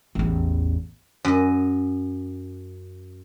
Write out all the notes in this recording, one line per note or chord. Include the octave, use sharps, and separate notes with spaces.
A1 E2
F#2 D#5